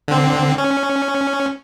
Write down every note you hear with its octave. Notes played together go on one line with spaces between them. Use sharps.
D3 C4
C#4